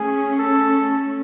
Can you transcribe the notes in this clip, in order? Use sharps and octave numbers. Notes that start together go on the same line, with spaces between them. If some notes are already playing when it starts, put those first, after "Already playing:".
Already playing: A3 C#4 G#4
A4